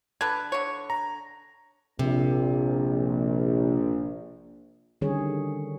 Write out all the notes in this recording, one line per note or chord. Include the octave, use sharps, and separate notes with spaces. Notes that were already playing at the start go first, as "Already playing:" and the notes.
D3 A4 B4 G#6
D3 C#5
A#5
A#1 C3
D3 D#3 G3 C#4 G#4 C#5